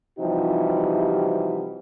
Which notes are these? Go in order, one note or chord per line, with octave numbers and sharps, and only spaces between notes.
C3 E3 F3 G3 D#4 F#4